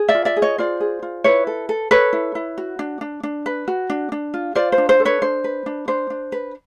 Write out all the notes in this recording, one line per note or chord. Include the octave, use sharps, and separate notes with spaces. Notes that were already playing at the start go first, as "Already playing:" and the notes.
Already playing: G#4
D5 E5
F4
D5 E5
G#4
C#5 D#5
F4 C5 D5
G#4
F4
E4 B4 C#5
A4
A4
A4 B4 C#5
E4
E4
F#4
D4
D4
D4
B4
F#4
D4
D4
F4
F4 C5 D5
C5
D4
C5
A4
B4 C#5
D4 C5
B4
D4
D4 C5
D4
B4